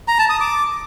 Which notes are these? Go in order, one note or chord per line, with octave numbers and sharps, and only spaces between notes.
A#5
A5
D#6
D6